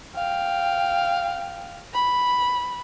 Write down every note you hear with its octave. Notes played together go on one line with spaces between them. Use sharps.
F5 G5
B5